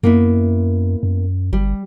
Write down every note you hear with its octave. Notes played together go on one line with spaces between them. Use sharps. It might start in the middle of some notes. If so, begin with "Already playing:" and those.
F#2 A#3 B3 E4
F#2
G1 G3